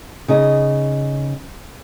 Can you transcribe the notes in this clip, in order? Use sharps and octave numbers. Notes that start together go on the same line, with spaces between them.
C#3 D#4 D#5